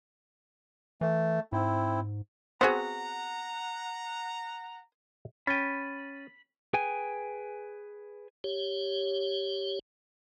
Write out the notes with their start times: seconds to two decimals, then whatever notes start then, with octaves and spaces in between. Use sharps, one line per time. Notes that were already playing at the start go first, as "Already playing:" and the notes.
1.01 E3 A3
1.52 G#2 C4 E4
2.61 B3 C4 F#4 G#4 C5 F#5 A#5
5.47 C#4 G5 B5 A6 D#7
6.74 G#4 B4 G5 G#5
8.44 G4 C#5